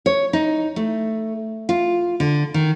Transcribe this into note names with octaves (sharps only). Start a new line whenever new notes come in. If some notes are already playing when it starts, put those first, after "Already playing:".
C#5
D#4
A3
F4
D3
D#3